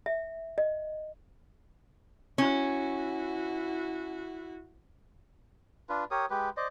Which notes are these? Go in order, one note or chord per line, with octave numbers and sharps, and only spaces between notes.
E5
D#5
C#4 E4 F#4
D4 F4 B4
G4 A#4 C#5 D#6
G#3 G4 B4
C5 D5 D#5